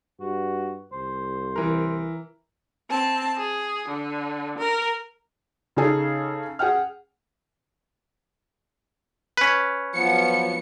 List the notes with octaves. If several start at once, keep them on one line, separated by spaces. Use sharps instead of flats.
G2 F#4
C2 C5
E3 A#4
C4 A5
G#4
D3
A#4
C#3 D#4 G#4 A4
G#4 F#5 G5 F6
C#4 B4
F3 F#3 B3 C#7